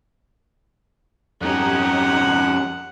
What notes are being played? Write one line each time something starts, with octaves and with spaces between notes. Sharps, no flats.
F2 C#4 D#4 G4 C#5 F#5